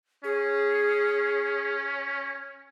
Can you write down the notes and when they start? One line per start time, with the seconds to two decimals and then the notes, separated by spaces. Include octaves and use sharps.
0.24 C#4 G#4